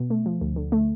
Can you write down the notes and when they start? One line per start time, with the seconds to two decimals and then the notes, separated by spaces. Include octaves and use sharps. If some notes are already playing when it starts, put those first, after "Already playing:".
Already playing: B2
0.10 A3
0.26 F3
0.41 D2
0.56 D3
0.72 A3